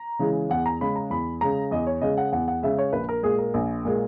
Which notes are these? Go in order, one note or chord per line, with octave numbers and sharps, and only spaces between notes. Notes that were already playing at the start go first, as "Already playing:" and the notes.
Already playing: A#5
C#3 E3 G#3
E2 F#5
A#5
C#3 G#3 B5
A#5
E2 B5
C#3 G#3 A#5
E2 D#5
C#5
C#3 G#3 D#5
F#5
E2 F#5
F#5
C#3 G#3 E5
C#5
A#1 B4
A#4
A#2 G#3 G#4
A#4
A#1
A#2 G#3